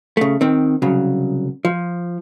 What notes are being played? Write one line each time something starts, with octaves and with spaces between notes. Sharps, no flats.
C#3 A3
D#3 C4
C2 C#3 F#3
F3